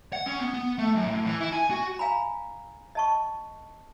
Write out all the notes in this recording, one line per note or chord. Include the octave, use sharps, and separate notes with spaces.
F#5
C#4
B3
B3
A3
F#2
A2
E3
E4
G#5
F#4
F5 G#5 A#5 B5
D#5 A5 C#6